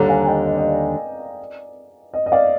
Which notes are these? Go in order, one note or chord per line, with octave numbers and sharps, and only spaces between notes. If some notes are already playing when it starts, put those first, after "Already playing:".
Already playing: D#2 D3 G3 A#5
F5 G#5
G#5
D#5 G5
D#5
D#5
D5
D#5
D#5
D5 F5